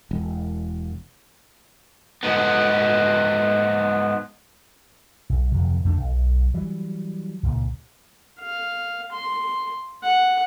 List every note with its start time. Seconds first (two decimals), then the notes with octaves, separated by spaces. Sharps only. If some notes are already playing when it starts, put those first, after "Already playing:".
0.11 E1
2.23 G#2 B3
5.29 B1
5.52 D1 F2 C3
5.85 E2 A3 D4
5.97 B1
6.54 E3 F#3 G3
7.43 C#2 A#2
8.39 F5
9.12 C6
10.03 F#5